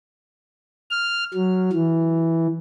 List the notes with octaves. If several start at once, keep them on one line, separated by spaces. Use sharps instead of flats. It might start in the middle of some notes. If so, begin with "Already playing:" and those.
F6
F#3
E3